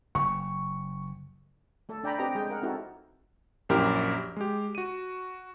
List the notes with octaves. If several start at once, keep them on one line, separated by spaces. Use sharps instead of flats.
F#1 C#6
A3 A4
D4 D5 G5 G#5 A#5 B5
C4 G4 B4 D#5 G5 A#5
G#3 G#4 G5
A#4 D#5 F#5
C4 D#4 E4 F#4 A4
A#1 F#2 E4 G4 A#4 F6
G#3 G4
F#4 D#7